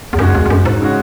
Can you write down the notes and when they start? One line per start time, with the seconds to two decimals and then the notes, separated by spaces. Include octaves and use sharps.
0.13 E2
0.18 F#2 C#3 G#3 C#4 F#4
0.35 E2
0.46 E2
0.50 F#2
0.65 G#2
0.81 C#3 G#3 C#4 F#4